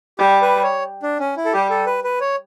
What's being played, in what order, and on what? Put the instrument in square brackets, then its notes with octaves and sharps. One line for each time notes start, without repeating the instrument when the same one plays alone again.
[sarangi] G3 [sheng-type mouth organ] G4
[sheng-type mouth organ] B4
C#5
D4
C#4
E4
A4
[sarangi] G3 [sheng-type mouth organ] G4
[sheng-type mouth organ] A4
B4
B4
C#5